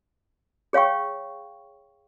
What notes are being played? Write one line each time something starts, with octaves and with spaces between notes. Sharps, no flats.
G#4 C#5 F5 G5 C#6